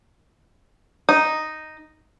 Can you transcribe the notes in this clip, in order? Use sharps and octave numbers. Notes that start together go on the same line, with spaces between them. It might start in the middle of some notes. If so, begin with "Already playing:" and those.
D#4